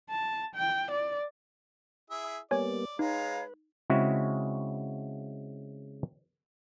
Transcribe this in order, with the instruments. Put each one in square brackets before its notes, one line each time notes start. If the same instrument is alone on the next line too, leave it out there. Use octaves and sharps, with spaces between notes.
[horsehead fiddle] A5
G5
D5
[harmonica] E4 G#4 E5
[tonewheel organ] G3 A#3 B3 [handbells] C#5 G#5 [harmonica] D5
[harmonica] G#3 [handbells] D#4 [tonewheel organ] B4 [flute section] C#5 F5 A#5
[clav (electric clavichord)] C#3 G#3 C4 E4 F#4